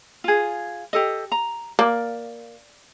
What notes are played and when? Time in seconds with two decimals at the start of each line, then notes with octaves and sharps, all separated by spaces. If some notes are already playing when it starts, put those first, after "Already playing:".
0.24 F4 G#4
0.93 G4 A4 D#5
1.32 A#5
1.79 A#3 D5